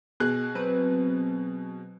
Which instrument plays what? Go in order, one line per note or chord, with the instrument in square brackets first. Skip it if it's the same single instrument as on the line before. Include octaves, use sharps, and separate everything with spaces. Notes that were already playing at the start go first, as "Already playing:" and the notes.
[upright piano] B2 G#4 F#6
[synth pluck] F#3 C4 B4